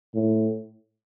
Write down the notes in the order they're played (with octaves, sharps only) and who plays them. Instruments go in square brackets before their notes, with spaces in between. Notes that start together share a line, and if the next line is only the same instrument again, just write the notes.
[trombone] A2